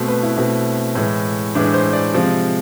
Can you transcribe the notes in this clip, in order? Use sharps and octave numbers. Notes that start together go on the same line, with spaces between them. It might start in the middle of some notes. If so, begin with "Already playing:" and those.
Already playing: B2 A3 C4 C5
B4
E4
B2 A3 C4
A2 E3 G#3
A2 E3 G#3 D4
C5
D5
C3 F3 G#3 C4